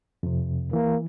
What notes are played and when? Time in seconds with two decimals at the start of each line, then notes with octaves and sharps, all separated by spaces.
0.23 F2 C3
0.73 E3 A#3